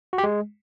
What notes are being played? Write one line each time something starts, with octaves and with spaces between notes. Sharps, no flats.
F#4
G4
G#3